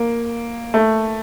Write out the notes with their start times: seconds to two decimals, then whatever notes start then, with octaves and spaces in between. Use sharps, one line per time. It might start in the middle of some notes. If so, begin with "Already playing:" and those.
Already playing: A#3
0.74 A3